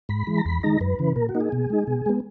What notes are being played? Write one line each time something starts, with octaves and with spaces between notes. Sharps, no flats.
G#2 B5
E3 G#3
A#5
E2 B5
D#3 G#3 D#4 A#5
F#2 B4
C#3 E3
A#2 A#4
F#4
A#3 D#4
G#4
B2
G#3 D#4
B2
G#3 B3